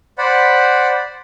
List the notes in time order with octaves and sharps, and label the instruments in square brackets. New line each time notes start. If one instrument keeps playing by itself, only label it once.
[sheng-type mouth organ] C5 D5 F#5 B5